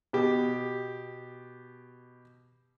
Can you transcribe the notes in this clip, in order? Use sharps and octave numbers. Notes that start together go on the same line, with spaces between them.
B2 G4